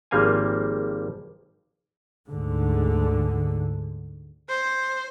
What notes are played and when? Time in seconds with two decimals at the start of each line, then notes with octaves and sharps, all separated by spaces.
0.11 G#1 F3 G3 A#3 F5 G#5
2.27 D2 G#2 D3
4.49 C5